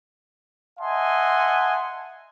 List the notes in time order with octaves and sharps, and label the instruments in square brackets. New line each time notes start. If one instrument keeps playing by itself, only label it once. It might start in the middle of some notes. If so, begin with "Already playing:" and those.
[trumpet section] D#5 E5 F#5 G#5 A5 C6